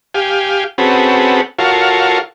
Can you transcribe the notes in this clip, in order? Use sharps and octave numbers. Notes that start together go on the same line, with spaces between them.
G4 F5 G#5
C4 C#4 F#4 G#4 A4 B4
F4 F#4 A4 A#4 C#5 F5